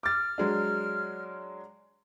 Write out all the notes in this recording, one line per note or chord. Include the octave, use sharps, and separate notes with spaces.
D6 F6 A6
F#3 G#3 D4